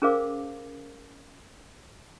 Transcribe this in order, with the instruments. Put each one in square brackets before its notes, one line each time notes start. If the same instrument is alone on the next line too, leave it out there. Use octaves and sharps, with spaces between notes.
[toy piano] C#4 G#4 A#4 C5 F5 D6